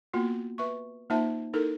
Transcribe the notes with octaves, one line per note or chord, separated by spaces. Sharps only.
A#3 B3 F4 F#4
B4 E5 C#6
A#3 D#4 F4 C5 E5 A5
D#4 E4 A4 A#4